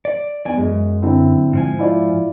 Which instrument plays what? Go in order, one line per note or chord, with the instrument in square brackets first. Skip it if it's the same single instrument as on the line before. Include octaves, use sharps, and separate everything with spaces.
[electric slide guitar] D5
[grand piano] E2 [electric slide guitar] D5 G#5
[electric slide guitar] F#2 [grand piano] G#3
[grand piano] D3 C4 E4
[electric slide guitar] G#2 F3 G#5
[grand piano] E4 F4 D5